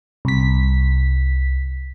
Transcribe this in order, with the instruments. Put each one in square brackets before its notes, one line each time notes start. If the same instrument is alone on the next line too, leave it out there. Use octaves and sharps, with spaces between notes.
[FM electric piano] C2 B6